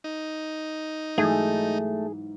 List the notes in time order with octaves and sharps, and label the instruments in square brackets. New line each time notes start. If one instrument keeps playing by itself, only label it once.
[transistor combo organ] D#4
[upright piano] G#2 E3 F#3 [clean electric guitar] A3 [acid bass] G#4